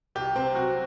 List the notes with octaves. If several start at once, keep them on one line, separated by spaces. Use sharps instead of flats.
C2 G4
C3 C4
F#3 F#4